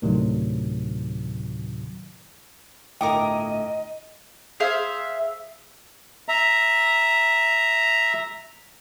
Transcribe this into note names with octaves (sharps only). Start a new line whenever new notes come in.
D2 A2 C3 D#3 F#3
G1 A2 A#4 D#5 G5 D6 D#6
G#4 C5 E5 F5
E5 A#5